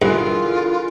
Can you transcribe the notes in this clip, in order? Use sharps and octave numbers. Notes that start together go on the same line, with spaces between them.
G2 D3 E3 F4 G#4 A#4